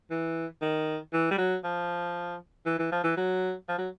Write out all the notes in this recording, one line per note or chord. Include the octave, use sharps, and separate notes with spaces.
E3
D#3
E3
G3
F#3
F3
E3
E3
F3
E3
F#3
F3
F#3